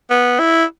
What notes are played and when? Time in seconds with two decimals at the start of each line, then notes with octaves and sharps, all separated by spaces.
0.10 B3
0.39 E4